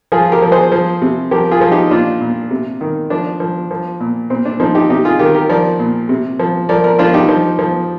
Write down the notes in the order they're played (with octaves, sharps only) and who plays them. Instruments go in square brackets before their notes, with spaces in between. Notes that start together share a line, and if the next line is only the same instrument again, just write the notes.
[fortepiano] F3 F4 G#4
G4 A#4
F3
G#4 C5
F3
C3
F3 G4 A#4
F4 G#4
F3
D#4 G4
A#2 D4 F4
A#2
C3
D#3
F3 D4
F3
F3
A#2
A#2 C4
D4
F3 C4 D#4
D#4 G4
C3 D#4 G4
F4 G#4
D#3 G4 A#4
G4 A#4
F3 A#4 D5
A#2
C3
F3
F3 A#4 D5
A#4 D5
F3 D4 F4
D#4 G4
F3
F3